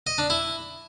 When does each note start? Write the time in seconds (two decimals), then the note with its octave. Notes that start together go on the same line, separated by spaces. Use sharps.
0.07 D#5
0.18 D4
0.30 E4